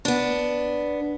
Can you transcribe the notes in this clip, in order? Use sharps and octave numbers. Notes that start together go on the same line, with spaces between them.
B3 D4